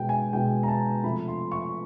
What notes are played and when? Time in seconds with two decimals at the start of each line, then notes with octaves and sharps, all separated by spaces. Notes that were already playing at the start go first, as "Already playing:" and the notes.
Already playing: B2 G#3 G5
0.09 G#5
0.33 B2 G#3 G5
0.63 A#5
0.68 A5
1.04 C3 F3 A3 B5
1.28 C6
1.52 C#6